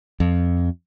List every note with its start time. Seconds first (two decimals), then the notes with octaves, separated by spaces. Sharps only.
0.20 F2